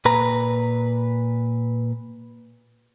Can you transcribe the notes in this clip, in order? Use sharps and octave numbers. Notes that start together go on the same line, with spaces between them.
A#2 B4 A#5